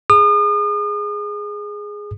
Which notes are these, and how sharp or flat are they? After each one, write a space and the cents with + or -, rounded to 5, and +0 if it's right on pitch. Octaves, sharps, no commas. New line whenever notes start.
G#4 +0 D#6 -40